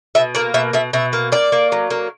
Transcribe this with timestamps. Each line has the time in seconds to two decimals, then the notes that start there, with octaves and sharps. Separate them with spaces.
0.15 B2 E5
0.35 A#3 D5
0.54 B2 E5
0.73 B2 E5
0.93 B2 E5
1.13 A#3
1.32 A#3 D5
1.52 A#3
1.72 F#3
1.90 A#3